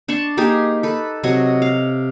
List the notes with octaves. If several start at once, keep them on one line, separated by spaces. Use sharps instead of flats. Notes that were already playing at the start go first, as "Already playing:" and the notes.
D4 A5 C6 C#6
A#3 D#4 G4 G#4
A4 B4
C3 F#3 C#5 D#5
F5